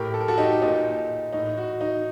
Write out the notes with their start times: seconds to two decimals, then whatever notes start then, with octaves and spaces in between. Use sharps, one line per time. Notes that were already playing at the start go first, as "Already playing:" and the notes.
Already playing: A2 G4 A#4
0.14 A4
0.20 A#4
0.28 F#4 A4
0.38 D#4 G4
0.62 A#2 D#4
1.33 A2 D#4
1.57 F#4
1.81 D#4